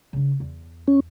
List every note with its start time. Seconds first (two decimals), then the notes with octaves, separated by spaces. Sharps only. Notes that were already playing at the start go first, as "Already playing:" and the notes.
0.13 C#3 D4
0.40 E2
0.88 C#4